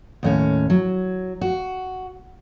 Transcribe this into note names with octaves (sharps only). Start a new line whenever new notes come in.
D#2 A2 C#4
F#3
F#4